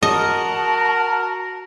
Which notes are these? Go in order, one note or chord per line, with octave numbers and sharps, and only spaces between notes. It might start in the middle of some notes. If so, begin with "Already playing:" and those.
F#4 A#4 D#5 A5